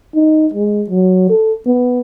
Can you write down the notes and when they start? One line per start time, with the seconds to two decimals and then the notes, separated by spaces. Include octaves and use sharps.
0.15 D#4
0.54 G#3
0.90 F#3
1.30 A4
1.66 B3